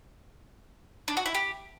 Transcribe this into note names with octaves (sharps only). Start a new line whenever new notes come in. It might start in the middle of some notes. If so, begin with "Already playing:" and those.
D4
F#4
E4
G4